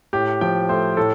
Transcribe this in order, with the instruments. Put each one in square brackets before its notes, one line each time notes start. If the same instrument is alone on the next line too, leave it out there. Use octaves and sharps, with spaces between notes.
[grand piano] A2 G4
F3 G5
A3 C5
A2 A4